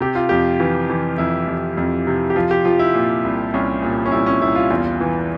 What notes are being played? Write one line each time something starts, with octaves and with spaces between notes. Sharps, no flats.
C3 G4
F4
F2 G4
E3
E3
F2 E4
F2
F2
C3
G4
F3 F4
G4
F3 F4
E4
A#2
C2
C2 C#4
A#2
C#4
C2 E4
C#4
C2 E4
F4
E2 F4
E3